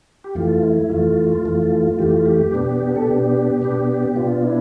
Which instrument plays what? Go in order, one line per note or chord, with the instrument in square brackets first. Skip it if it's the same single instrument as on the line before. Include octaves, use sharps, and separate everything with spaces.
[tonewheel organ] G4
F2 E3 A3 F4
E4
F2 E3 A3 F4
F2 E3 A3
F2 E3 A3 G4
F4
G4
B2 B3 D4
A4
B2 B3 D4 G4
B2 B3 D4
B2 B3 D4 F4
E4